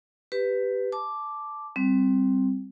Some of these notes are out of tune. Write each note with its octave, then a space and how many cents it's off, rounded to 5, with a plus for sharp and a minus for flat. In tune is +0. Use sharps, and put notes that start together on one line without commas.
G4 +0 B4 +10
A5 -15 D6 +0
G3 +0 C4 +0